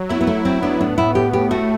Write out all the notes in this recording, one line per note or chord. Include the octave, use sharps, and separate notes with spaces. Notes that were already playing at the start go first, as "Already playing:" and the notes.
Already playing: F#3
B3 E4
B3
A3 E4
C4 E4
B3 D4
A2 D4
A2 E4
A2 G4
A2 G4
A3 F#4